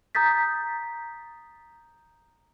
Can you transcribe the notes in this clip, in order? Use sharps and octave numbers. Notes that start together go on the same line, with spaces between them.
A#5 D#6 G6 A6 B6